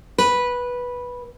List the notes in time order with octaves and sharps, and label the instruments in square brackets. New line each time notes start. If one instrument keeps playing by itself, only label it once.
[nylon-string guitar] B4